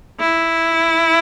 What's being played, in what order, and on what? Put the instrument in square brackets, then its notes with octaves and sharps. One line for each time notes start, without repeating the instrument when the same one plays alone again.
[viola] E4